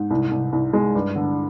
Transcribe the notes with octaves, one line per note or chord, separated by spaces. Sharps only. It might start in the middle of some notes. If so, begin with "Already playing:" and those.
Already playing: G#2
C2
C2
C2
G#3
G2
D3